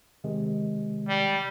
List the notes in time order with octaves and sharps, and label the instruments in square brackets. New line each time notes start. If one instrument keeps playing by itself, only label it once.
[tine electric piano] C3 D#3 G#3
[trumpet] G3